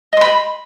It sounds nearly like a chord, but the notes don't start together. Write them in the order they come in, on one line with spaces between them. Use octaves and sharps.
D#5 C6 B5